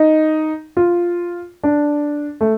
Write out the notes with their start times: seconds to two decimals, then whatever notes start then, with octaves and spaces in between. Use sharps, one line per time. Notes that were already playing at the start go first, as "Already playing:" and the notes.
Already playing: D#4
0.77 F4
1.63 D4
2.41 A3